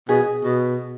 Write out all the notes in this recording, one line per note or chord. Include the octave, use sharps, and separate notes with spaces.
B2 G#4
B2